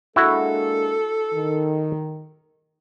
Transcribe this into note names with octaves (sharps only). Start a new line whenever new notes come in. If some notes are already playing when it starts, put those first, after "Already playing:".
G#3 A#3 D4 E4 F#4 A4
D#3